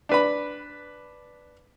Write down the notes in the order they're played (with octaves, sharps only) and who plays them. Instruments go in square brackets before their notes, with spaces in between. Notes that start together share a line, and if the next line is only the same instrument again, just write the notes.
[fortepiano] D4 B4 B5